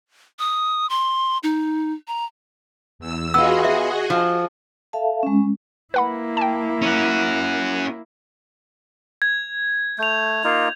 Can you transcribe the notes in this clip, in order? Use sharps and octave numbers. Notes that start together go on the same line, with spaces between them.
D#6
C6
D#4
A#5
E2 E6
B3 F4 F#4 G#4 D#5 E6
E5
F3
A4 E5 F5 A5
G#3 C#4
A#3 E4 B4 F#5 B5
G5 A5
C#4 F#4
G#6
A3 G6 F7
A#3 D#4 F4